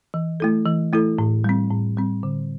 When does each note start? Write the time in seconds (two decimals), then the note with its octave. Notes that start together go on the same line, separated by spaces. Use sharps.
0.14 E3
0.40 A3 E4 A4
0.66 E3
0.93 A3 E4 A4
1.18 A2
1.44 G3 C4
1.71 A2
1.97 G3 C4
2.23 D3